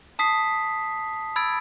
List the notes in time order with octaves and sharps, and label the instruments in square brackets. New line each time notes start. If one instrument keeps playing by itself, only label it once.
[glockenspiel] A5 D#6 B6 C7
B5 E6 G#6 A6 D7